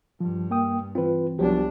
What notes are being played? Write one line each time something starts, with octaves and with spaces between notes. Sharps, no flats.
G2 F3
A#3 G5 D#6
E3 C4 F4 B4
C2 F3 F#3 B3 D4 G4